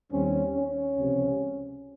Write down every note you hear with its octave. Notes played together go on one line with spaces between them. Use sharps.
D#2 D#3 G3 C4 C#4
C#4
C#2 C3 F3